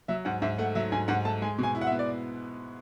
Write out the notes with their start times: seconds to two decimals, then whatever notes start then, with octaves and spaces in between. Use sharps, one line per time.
0.08 F#3 E5
0.25 G#2 F#5
0.42 G#2 E5
0.58 A3 F#5
0.75 F#3 E5
0.92 G#2 G#5
1.08 G#2 F#5
1.25 A3 A5
1.42 G#3 G#5
1.58 B2 G#5
1.75 E4
1.81 F#5
1.87 E5
1.92 B3
1.99 D5